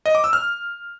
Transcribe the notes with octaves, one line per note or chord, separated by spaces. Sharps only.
D#5
D6
E6
F6